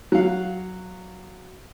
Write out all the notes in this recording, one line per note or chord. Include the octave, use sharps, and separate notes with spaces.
F#3 F5